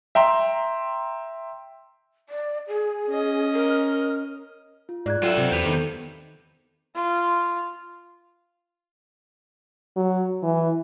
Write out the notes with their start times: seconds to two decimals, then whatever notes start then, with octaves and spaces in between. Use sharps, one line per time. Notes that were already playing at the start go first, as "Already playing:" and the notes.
0.15 E5 G5 A#5 C6
2.29 D5
2.67 G#4
3.08 C#4 D#5
3.53 A#4
4.89 F4
5.06 G#2 D5 F#6 G#6
5.23 F#3 F4 A4 E5 G5
5.37 C3 C4 C5
5.51 E2 G4 B4
5.66 D#3 B3 A4
6.95 F4
9.96 F#3
10.43 E3